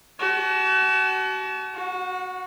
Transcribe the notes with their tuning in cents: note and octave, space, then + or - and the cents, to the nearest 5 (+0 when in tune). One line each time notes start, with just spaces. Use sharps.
F#4 +35 A5 -35
F#4 +0 F#5 -35